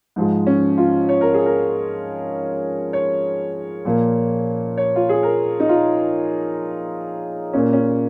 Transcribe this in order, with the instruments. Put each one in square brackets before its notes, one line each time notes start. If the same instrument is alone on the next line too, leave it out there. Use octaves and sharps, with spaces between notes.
[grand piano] G#2 F3 G#3
C#4
F4
C#5
A#4
G#4
A#4
C#5
A#2 F3 A#3
C#5
F4
G#4
A#4
D#4
F4
A#2 A#3 C#4
C#4